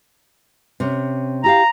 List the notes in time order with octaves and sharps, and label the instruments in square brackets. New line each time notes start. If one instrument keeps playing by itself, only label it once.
[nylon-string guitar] C3 C#4
[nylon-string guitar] E4 G4 F5 [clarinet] A#5